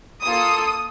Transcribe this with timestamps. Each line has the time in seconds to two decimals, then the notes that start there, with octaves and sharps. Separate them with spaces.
0.22 A#3 F4 A4 D#6